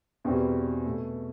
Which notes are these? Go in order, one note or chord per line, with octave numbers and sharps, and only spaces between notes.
E2 B2 G3 C4
B2 A3